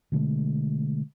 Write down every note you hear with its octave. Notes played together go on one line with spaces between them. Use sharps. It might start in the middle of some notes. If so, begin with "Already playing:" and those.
B2 D3 G#3 A3